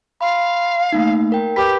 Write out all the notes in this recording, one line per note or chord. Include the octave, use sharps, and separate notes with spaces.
F5 B5 C6
A3 A#3 D#4
A#4 G5
G4 B4 B5 B6